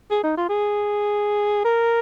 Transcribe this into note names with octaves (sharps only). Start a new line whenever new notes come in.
G#4
D#4
F4
G#4
A#4